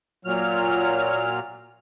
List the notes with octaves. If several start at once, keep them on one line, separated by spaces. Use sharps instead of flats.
A#2 F#3 F6